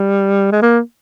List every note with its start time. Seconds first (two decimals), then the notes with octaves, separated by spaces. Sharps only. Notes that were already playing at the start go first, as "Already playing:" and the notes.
Already playing: G3
0.52 G#3
0.62 A#3